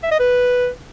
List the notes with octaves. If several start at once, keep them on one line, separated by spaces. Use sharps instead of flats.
E5
D#5
B4